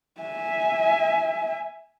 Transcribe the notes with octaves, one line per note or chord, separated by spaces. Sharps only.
E5 G#5